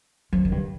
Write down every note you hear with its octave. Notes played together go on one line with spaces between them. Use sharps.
F3
D#3
G2